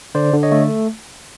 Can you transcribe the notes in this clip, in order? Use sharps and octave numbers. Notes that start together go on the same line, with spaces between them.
D3 C5 D5
D3
C#5 D#5
A3